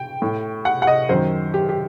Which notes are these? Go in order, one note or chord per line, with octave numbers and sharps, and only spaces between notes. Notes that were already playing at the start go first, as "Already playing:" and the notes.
Already playing: G5
A2
F#5
F#5
D#5
F#2 D#3 C5
G4
G4